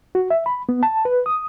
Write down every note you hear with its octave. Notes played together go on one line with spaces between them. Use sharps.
F#4
E5
B5
B3
A5
B4
D#6